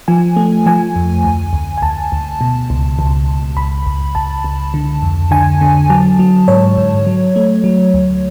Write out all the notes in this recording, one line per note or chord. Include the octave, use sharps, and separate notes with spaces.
F3 G#5
A3
F3 G#5
F2
D2
D2
G#5
D2 A5
D2
B2
C#2
C#2
C#2
C#2 B5
C#2
C#2 A5
C#2
D3
F2
D3 G#5
D3
F#3 A5
F#3
G#2 C#5
G#2
F#3
A3
F#3
D2